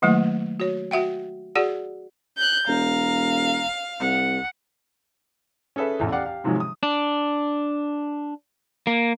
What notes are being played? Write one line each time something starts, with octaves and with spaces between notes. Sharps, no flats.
D#3 F#3 A3 A#3 E4
F#4 C#5
F#4 E5 F#5 G5
F#4 G#4 D5 F#5
F#6 G6
E1 F5 A#5
C2 F#5
C#4 G#4 A4 B4 E5
A1 E2 E3
G4 D5 F5 F#5
G4 F5
G#2 C3 D#3 F3 F#3 G#3
D#6
D4
A#3